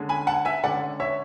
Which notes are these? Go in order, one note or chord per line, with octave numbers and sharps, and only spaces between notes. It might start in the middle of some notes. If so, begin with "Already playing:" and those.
Already playing: D3 G#3 C#4
G#5 B5
F#5 A5
E5 G#5
D3 G#3 C#4 D5 F#5
C#5 E5